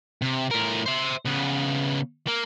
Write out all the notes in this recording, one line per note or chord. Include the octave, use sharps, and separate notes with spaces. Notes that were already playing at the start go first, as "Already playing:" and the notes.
C3
A2 A#4
C5 E5
C#3 B3
A#3